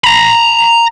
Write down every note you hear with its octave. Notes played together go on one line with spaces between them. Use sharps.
A#5 B5